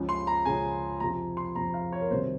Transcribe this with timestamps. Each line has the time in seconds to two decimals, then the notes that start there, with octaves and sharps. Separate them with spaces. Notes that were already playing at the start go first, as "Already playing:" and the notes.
Already playing: C#2 C#3 F3
0.09 C6
0.27 A#5
0.45 C#2 C#3 F3 G#5
1.00 F2 C3 F3 C4 A#5
1.37 C6
1.55 F2 C3 F3 C4 A#5
1.74 F5
1.92 C#5
2.01 A#4
2.11 C2 C3 D#3 F#3 C5